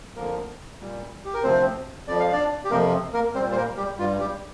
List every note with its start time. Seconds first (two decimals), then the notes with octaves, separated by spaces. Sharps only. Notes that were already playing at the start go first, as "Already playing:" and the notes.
0.16 F2 D3 F3 A#3 A#4
0.80 A#2 G3
1.25 G4
1.34 A#4
1.43 D2 C3 F3 C4 C5
2.07 F2 F3 D5
2.20 F5
2.32 D4 D5
2.64 G4
2.71 F2 C3 F3 A#3 A#4
3.13 A#3 A#4
3.34 G3 C4 C5
3.40 A#2
3.52 C5
3.56 A#3 A#4
3.77 G3 G4
3.99 G2 G3 F4
4.20 G3 G4